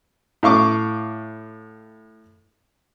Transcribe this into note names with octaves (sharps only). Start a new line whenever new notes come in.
A2 F5 C#6 D6